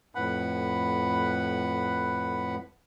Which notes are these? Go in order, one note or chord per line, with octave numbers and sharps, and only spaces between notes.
F2 A2 B4 F#5 B5